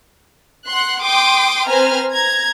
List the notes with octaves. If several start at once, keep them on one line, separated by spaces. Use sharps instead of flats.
F#5 C6 F#6
G5 C6 D6 D#6
C4 B4 C5 G#5 A#5 F6
A#5 G#6